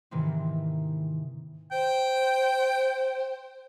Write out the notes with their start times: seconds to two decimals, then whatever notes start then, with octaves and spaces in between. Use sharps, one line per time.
0.11 G#2 C3 D#3 E3 A#3 C4
1.72 C5 G5